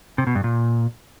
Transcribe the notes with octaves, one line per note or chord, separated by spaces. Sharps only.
C3
B2
G2
A#2